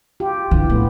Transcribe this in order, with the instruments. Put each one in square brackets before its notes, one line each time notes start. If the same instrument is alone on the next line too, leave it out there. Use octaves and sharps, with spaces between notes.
[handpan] F4 G4
[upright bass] D3 [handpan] E3
[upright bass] A2 [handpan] B3